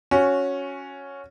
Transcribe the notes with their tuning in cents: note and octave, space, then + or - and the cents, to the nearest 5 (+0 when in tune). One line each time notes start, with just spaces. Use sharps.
C#4 +0 F#4 -15